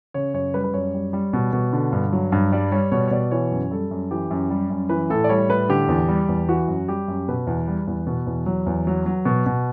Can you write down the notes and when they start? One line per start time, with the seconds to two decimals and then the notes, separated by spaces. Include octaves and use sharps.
0.14 C#3 C#5
0.34 F#2 C#5
0.54 G3 B4
0.64 B4
0.74 F#2 C#5
0.94 G3
1.13 G3
1.33 B2
1.53 B2
1.73 D3
1.93 G2
2.13 F#3
2.32 G2
2.52 G3 D5
2.71 G3 C#5
2.92 B2 C#5
3.08 C#5
3.11 B2 D5
3.31 E3 C#5
3.51 F#2
3.71 G3 A4
3.91 F#2
4.11 E3 G4
4.31 F#2
4.50 G3
4.70 F#2
4.89 E3 B4
5.10 A2 A4
5.24 D5
5.29 G3 C#5
5.49 A2 B4
5.69 D3 G4
5.88 E2
6.08 G3
6.29 E2
6.48 E3 F#4
6.68 F#2
6.88 G3 G4
7.08 F#2
7.28 B2 B4
7.47 E2
7.67 G3
7.87 E2
8.07 B2
8.27 E2
8.46 F#3
8.66 E2
8.87 F#3
9.06 F#3
9.25 B2
9.46 B2